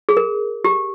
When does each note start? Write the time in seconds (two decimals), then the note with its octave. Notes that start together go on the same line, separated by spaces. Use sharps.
0.09 G#4
0.17 A#4
0.65 G4